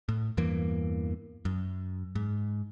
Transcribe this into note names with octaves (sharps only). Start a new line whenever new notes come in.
A2
E2 G2 E3 A#3
F#2
G#2